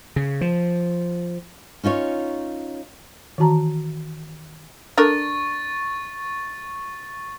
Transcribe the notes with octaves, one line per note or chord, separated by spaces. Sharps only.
C#3
F3
C#4 D#4 F4 C#5
D#3 E3 F#4 A5 A#5
D4 A4 A#4 C#6 A6